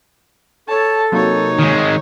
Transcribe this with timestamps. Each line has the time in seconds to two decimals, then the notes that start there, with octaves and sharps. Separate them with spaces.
0.68 A4 C#5 A5
1.12 C3 F#3 A#3 D#4 C#5
1.59 D#3 G#3